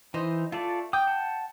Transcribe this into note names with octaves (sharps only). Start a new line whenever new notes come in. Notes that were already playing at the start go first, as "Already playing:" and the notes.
E3 D#4 C5
A3 F4 A4 D5
G5 D6 D#6
F#5 A5